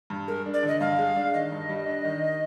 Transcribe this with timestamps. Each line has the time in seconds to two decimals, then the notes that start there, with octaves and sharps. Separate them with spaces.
0.10 G2
0.28 G#3 A#4
0.46 D4
0.54 D5
0.63 D3 D#5
0.80 G2 F5
0.99 G#3
1.16 D4
1.33 D#3 D#5
1.52 G2
1.69 G3
1.87 D4
2.05 D#3